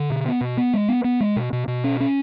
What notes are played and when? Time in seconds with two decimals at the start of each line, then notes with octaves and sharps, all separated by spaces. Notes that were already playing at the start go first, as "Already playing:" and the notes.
Already playing: D3
0.10 B2
0.25 B3
0.41 B2
0.57 B3
0.74 G#3
0.89 B3
1.04 B3
1.20 G#3
1.36 B2
1.53 B2
1.68 B2
1.84 C#4
2.00 C#4